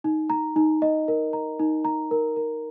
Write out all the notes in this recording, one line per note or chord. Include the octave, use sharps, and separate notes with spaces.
D#4
A#5
D#4
D#5
A#4
A#5
D#4
A#5
A#4
A#4